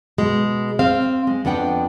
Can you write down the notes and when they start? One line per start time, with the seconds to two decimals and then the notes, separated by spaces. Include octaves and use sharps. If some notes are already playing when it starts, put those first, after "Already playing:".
0.18 B2 G#3
0.79 C4 F5
1.27 G#3
1.45 F2 B3 D4 F#5 G5